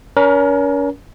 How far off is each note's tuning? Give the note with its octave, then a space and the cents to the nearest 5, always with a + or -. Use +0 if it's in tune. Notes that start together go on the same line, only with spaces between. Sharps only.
C#4 +35 A#4 +35 A#5 +0